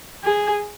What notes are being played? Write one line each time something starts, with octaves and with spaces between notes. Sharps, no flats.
G#4